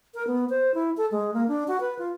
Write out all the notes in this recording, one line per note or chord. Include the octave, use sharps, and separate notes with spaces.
A#4
B3
C5
E4
A4
G#3
A#3
D4
F#4
B4
F4